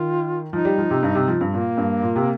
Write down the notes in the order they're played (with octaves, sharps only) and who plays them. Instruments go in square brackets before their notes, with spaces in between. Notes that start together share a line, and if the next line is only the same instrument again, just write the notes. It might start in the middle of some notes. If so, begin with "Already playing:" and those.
Already playing: [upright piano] D#3 [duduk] F4
[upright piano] F3 [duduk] D#4
[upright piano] G3
F3
C3
G2
C3
F3
G2
[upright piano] A#2 [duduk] A#3
[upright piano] G2
A#2
C3